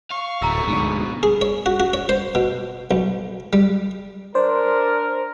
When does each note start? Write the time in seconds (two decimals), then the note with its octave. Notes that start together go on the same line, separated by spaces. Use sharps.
0.11 F5 C#6
0.42 D1 F#2 A3 A#5 E6
0.68 D2 G#2 B2
1.23 G#4
1.41 C#5
1.66 F#4
1.80 F#4
1.93 C#5
2.09 C5
2.35 B2
2.91 B1
3.53 G3
4.35 D4 A#4 C5